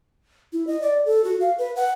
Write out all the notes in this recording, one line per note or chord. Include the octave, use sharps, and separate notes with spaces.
E4
D#5
D5
A4
F#4
F5
B4
F#5